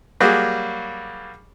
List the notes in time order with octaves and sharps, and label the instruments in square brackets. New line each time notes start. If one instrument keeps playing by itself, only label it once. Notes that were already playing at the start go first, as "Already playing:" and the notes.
[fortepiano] F#3 G3 A#3 F#4 G#4